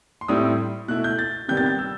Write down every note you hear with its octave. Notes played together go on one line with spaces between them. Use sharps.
C6
A2 G3 C4 E4 D#6
B2 A3 E4 F#6
G6
A6
C3 D#3 G3 B3 G6
A6
G6
E6